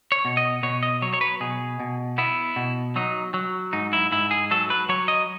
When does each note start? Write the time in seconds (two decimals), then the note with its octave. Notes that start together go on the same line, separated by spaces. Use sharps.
0.12 C#5
0.25 B2
0.37 D#5
0.63 B2 C#5
0.83 D#5
1.02 F#3 C#5
1.13 C#5
1.21 B4
1.40 B2 G#4
1.80 B2
2.18 B3 E4
2.56 B2
2.96 F#3 D#4
3.34 F#3
3.73 G#2 D#4
3.93 E4
4.12 G#2 E4
4.31 G#4
4.51 F#3 A4
4.70 B4
4.89 F#3 C#5
5.08 D#5